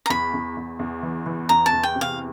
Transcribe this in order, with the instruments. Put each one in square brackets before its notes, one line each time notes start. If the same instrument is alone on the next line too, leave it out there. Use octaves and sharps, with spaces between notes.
[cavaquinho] A#5
[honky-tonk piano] E2 [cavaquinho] B5
[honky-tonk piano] E2
E2
E2
E3
E3
[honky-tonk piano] E2 [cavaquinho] A#5
[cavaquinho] A5
[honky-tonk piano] E2
[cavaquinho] G5
[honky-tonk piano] C3
[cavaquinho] F5